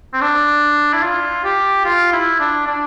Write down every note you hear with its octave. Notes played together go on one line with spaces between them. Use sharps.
C4
D4
E4
F4
G4
F4
E4
D4
D4